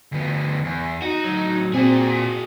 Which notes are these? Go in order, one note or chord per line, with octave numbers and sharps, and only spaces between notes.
D2 B3
E2
D#4 F#4
A2 F#3
A#2 C4 F#4 G#4